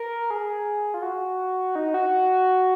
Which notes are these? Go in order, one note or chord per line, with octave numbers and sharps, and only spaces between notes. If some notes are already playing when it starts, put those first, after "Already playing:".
Already playing: A#4
G#4
F4
F#4
D#4
F#4